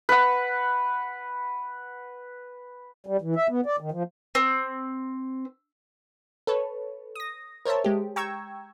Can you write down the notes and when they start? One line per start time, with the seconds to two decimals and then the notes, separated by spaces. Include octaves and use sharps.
0.09 B4 F#5
3.06 G3
3.21 E3
3.36 E5
3.49 B3
3.66 D5
3.80 D#3
3.92 F3
4.35 C4
6.47 A4 B4 C#5
7.15 D#6 A#6
7.66 A#4 C5 C#5 E5 A5
7.84 G#3 G4
8.16 G5 A#5 C#6 E6 G#6